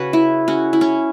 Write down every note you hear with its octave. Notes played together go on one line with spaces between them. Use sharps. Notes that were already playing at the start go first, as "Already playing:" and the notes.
Already playing: C#3 F#4 B4 C#5
E4
C#4 F#4
E4
C#4